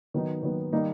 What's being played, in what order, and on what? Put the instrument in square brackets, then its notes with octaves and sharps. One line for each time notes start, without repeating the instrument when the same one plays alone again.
[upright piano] D#3 F#3 B3 D#4
D#3 F#3 B3 D#4
D#3 G3 A#3 D#4